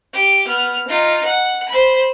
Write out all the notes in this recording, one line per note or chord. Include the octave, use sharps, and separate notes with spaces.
G4 D6
B3 F6
D#4 F4
F#5
C5 B5